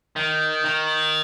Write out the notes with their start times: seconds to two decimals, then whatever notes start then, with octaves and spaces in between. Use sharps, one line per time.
0.16 D#3
0.65 D#3